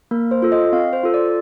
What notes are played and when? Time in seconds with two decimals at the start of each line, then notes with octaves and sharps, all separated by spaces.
0.11 A#3 A#4
0.31 C5
0.42 F4 A4
0.52 D#5
0.73 C4 F5
0.93 C5
1.03 F4 A4
1.14 D5